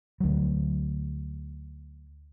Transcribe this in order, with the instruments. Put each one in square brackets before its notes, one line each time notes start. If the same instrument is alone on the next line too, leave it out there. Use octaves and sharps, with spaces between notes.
[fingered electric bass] D2 F#3